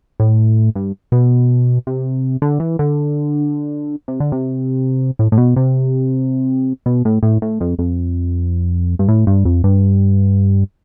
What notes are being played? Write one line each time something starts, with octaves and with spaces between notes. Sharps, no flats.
A2
G2
B2
C3
D3
E3
D3
C3
D3
C3
A2
A2
B2
C3
B2
A2
A2
A2
F2
F2
G2
A2
G2
F2
G2